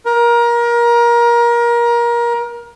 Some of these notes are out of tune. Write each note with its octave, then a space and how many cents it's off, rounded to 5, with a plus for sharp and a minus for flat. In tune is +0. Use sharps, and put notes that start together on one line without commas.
A#4 +25